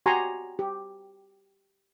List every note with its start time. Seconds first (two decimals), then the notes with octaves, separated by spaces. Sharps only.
0.06 F#4 G4 G#5 A#5 C6 C#6
0.59 G4